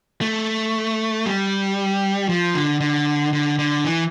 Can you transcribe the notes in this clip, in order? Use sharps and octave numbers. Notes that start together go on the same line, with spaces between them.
A3
G3
F3
D3
D3
D3
D3
E3